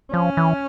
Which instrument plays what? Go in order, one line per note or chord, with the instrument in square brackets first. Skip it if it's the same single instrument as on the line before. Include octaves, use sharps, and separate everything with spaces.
[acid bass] F3 [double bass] C#4
[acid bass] E3